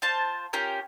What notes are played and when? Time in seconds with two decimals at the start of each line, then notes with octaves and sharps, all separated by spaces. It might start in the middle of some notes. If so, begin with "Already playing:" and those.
0.02 F4 C5 A5
0.53 C#4 F4 G4 A#4